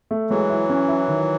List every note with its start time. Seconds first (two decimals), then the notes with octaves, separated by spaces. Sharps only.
0.11 A3
0.30 E3 F#3 G#3
0.50 E4
0.70 C#4
0.88 E4
1.08 D#3